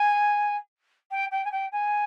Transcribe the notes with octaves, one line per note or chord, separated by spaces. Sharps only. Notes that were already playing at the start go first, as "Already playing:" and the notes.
Already playing: G#5
G5
G5
G#5
G5
G#5